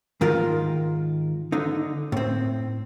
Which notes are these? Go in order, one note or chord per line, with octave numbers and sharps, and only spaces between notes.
G#2 D#3 F4 A#4
D3 D#4
A2 C4